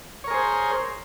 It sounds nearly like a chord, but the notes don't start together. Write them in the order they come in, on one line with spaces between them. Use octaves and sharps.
C#5 A#4 G#4 C5